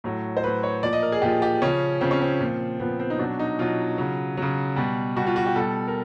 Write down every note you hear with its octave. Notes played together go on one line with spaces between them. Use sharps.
A2 F#3
C5
A2 F#3 B4
C#5
A#2 F3 D5
D#5
A#4
G#4
A#2 F3 G4
G4
C#3 F3 C#4
C#3 F3 C4
C#4
C4
A#2 F3
A#2 F3 B3
C4
D#4
B2 F#3 D4
D#4
B2 F#3 F4
C#3 F#3
C#3 F#3
B2 G3
B2 G3 F#4
F4
F#4
G4
B2 G3 A4
A#4